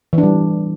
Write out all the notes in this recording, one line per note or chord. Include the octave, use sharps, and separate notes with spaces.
E3
D4
G3